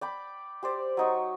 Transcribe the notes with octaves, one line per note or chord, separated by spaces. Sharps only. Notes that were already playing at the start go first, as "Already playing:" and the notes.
D5 G5 B5
G4 C5 D5
F#3 D#4 C#6